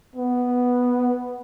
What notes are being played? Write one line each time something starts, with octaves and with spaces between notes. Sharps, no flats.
B3